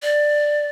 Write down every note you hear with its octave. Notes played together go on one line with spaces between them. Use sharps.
D5